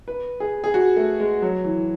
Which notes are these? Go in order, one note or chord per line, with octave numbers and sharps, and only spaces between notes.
B4
G#4
G#4
F#4
A3
G#3
F#3
E3